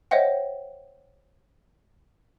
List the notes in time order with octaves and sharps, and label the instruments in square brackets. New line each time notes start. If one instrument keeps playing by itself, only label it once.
[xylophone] C5 C#5 D#5 E5 F#5 G5